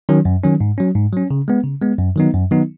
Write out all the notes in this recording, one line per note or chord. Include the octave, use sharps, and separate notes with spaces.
D#3 F#3 C#4
F#2
D#3 F#3 C#4
G#2
F#3 C#4
G#2
F#3 C#4
C#3
G#3 B3
C#3
G#3 B3
F#2
D#3 F#3 B3 D#4
F#2
D#3 F#3 B3 D#4